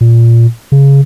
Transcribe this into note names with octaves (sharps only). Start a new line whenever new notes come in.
A#2
C#3